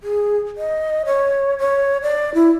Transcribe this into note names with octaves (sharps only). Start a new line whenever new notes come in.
G#4
D#5
C#5
C#5
D5
E4